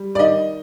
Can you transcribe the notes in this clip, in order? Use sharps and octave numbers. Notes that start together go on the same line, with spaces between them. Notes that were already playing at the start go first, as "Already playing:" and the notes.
Already playing: G3
D5
D#3 D#5